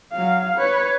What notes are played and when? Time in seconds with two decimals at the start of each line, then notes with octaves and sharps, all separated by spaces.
0.13 F#3 F5
0.57 B4 C#5